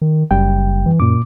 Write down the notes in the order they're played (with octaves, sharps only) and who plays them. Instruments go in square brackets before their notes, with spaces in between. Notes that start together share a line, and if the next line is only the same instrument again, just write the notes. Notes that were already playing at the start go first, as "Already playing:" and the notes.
[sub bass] D#3
[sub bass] F#1 [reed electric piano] F#2 G3 G5
[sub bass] E3
[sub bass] F#2 [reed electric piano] A#2 D6